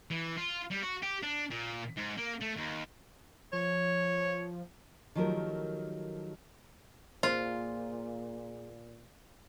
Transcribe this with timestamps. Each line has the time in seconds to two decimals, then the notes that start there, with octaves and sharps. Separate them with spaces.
0.11 E3
0.37 F4
0.71 G3
0.82 F#4
1.03 G4
1.22 D4
1.50 A#2
1.97 G#2
2.17 A#3
2.41 A3
2.56 D#2
3.53 F3 C#5
5.15 D#3 F3 F#3 A3 G4 A#4
7.23 A#2 A#3 F4 G#4 C5